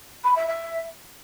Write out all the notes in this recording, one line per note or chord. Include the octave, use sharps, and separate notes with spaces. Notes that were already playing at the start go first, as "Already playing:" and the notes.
B5
E5
E5